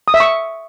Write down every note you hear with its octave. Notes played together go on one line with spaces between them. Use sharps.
D#6
E5
C#6